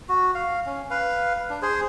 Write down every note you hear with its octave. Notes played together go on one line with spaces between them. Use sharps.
F#4
F5
C#4
B4 F5
D4
G#4 C5